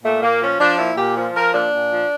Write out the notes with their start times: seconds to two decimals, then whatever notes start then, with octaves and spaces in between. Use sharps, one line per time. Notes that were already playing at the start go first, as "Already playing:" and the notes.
0.03 A#2 A3
0.22 A#2 A#3
0.41 F3 C#4
0.59 F3 D4
0.78 A#2 E4
0.97 A#2 G4
1.16 F3
1.34 F3 A#4
1.53 A#2 D4
1.73 A#2
1.91 F3